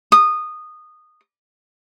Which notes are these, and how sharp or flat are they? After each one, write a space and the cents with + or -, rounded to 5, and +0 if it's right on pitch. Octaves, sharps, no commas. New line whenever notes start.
D#6 -15